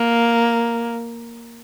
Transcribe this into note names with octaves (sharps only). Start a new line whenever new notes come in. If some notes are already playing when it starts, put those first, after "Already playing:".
Already playing: A#3